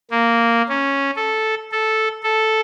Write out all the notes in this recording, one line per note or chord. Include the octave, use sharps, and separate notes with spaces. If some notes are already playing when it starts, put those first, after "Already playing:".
A#3
C#4
A4
A4
A4